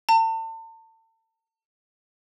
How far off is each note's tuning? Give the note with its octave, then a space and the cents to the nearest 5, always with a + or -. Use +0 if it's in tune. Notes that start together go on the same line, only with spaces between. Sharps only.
A5 +40